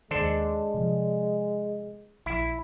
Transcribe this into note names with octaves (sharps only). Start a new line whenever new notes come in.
D#2 D#3 G#3 D4 A4 C5
C3 F3
A#1 E4